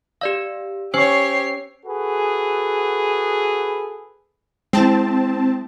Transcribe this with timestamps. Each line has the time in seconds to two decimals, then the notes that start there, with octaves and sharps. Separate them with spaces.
0.21 G4 D5 F5 E6 E7
0.94 C#4 G4 C5 C#5 C#6 E6 C7
1.85 F#4 G#4 A4 B4
4.73 G#3 C4 E4 A5